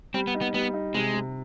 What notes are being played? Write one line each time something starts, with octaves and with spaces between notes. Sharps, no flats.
G3 C4
B3
D#4
B3
G3 B3
D#4
C3 G#3
C3